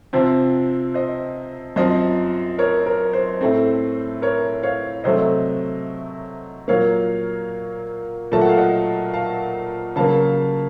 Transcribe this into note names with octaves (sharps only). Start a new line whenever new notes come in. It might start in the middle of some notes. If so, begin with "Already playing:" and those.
C3 F3 C4 C5
C5 D#5
F#2 F3 C4 C5 D#5
A#4 C#5
A#4
C5
A2 A3 C4
A#4 C#5
C#5 F5
C3 F#3 A3 C5 D#5
A#2 F#3 A#3 C#5 F5
A#2 F#3 A3 A5
F#5
F5
D#5 F#5
F5 A5
C#3 F#3 A#3 F5 A5